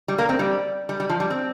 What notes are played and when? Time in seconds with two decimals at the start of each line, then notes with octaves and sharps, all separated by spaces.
0.08 G3
0.18 A#3
0.29 C4
0.39 G3
0.89 G3
1.00 G3
1.10 F3
1.20 G3
1.30 C4